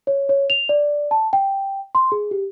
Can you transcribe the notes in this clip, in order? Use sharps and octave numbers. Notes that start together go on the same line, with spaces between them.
C#5
C#5
F7
D5
A5
G5
C6
G#4
G4